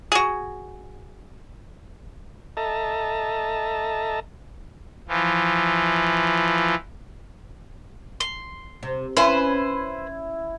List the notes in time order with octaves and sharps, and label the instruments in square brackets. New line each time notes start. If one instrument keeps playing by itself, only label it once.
[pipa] F#4 G#4
[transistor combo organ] A4 D#5 E5 A5 A#5
[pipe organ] E3 F3
[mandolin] C6
[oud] C3
[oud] C#4 [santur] E4 [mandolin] B4 C5